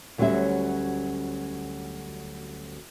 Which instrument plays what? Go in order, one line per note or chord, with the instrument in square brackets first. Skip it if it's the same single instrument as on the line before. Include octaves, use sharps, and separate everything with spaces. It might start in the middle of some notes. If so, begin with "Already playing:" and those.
[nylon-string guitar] D2 F#3 G3 C#4 F#4 E5